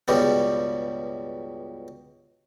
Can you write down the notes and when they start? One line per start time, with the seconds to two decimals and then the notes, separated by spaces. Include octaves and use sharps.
0.08 C#2 G2 B2 G3